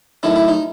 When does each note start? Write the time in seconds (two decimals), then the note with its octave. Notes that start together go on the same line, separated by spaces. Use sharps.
0.23 F#2 D#3 A3 C#4 E4
0.36 E4
0.48 D#4